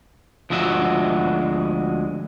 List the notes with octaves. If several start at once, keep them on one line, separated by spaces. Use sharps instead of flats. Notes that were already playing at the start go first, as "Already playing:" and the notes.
D2 F3 G#3 F#4 E5